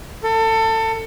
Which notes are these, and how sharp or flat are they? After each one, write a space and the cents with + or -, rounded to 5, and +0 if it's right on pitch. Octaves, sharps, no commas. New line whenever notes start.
A4 +25